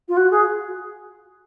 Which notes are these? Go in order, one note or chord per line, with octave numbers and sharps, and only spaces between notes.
F4
F#4
G#4